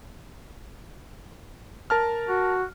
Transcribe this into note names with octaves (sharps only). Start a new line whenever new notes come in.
A#4 A5 F6
F#4